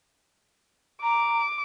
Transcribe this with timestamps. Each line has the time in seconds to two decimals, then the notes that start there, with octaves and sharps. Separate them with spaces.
1.03 A#5 D6